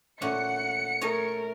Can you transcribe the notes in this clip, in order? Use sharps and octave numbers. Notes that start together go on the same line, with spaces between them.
A#2 A3 C#4 F#5 C#7
A3 A#4 C#5 D#5 G#5